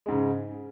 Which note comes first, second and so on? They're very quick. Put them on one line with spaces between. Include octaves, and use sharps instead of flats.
G#3 G#2 C#3